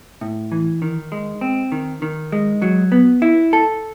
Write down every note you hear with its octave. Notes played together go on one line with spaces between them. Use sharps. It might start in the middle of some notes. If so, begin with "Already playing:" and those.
A2
E3
D#3
G#3
C4
D#3
D#3
G#3
F#3
B3
E4
A4